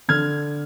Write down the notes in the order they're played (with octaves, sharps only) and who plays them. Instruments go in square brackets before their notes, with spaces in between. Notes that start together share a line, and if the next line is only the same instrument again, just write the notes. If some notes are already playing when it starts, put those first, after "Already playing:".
[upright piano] D3 F6 G#6